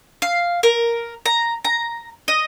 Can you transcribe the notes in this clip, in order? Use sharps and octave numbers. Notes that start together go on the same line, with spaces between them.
F5
A#4
A#5
A#5
D#5